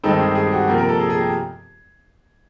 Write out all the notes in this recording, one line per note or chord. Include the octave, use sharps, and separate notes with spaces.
G2 D#3 G#3 C4 D#4 A4
G#4
G4
G#4
G4
F#4
C3 F3 A#3 G4
A#4
A4
G#4
G#4
G4